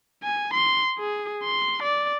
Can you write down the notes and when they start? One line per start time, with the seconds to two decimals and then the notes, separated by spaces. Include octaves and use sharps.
0.23 G#5
0.54 C6
0.99 G#4
1.44 C6
1.83 D5